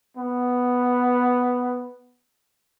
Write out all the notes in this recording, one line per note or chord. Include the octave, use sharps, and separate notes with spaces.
B3